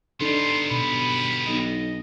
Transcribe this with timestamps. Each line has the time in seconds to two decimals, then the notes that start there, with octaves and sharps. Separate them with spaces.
0.21 G3 B3 D4 D#4 A4 C6
0.71 B2 B5
1.47 B1 D#5